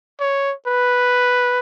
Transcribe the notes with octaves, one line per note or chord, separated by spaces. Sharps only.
C#5
B4